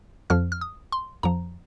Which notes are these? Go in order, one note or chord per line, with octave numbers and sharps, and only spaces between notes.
F2 F3 F6
F6
D#6
C6
F2 F3 A#5